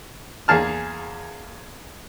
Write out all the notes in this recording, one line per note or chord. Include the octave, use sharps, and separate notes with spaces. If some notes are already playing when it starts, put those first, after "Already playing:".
E2 A#3 G#4 A5 F6